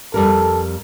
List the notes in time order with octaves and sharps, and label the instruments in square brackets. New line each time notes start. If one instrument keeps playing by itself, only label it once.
[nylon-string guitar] F2 G3 A#4 [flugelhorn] A4